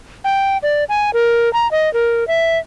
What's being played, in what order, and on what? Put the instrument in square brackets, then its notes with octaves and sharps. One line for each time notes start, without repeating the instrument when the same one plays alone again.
[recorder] G5
D5
G#5
A#4
A#5
D#5
A#4
E5